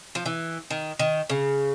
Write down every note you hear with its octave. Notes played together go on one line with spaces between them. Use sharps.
F3
E3
D#3
D#3
C#3